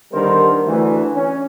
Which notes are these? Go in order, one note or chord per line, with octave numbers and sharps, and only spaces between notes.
D3 D#3 G3 B3 A#4 C5
D2 E3 A3
C#4